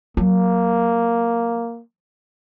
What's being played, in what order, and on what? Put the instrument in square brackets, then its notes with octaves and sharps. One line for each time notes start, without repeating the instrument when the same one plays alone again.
[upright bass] F#3 [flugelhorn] A#3